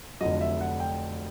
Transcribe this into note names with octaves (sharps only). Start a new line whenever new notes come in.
F1 F2 D3 F#3 D#5
E5
F#5
G5